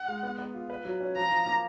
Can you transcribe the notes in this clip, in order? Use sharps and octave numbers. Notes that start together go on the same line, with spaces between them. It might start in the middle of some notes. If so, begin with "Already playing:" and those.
Already playing: F#5
G#3
B3
B3
F4
B4
F#3
C#4
F3 A#5
F3
A#3